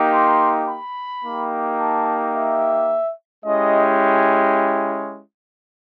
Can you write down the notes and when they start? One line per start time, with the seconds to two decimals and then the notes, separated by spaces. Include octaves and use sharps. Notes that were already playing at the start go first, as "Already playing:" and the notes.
Already playing: A#3 D#4 G4
0.12 C6
0.67 B5
1.23 A#3 D#4 G4
1.78 A5
2.34 E5
3.45 G#3 C#4 E4 G4 D#5